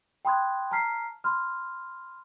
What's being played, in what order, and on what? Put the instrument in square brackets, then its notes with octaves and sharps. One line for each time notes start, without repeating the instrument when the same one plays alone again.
[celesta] G5 B5 C6 D#6 F#6 G#6
A5 A#5 F6 B6 C7
B5 C6 F6